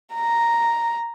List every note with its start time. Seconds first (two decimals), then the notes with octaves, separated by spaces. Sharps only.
0.15 A#5